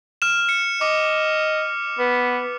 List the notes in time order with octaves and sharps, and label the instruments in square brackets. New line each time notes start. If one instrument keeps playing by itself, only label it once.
[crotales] F6 E7
C#7
[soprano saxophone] D#5 [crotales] D6
[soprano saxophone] B3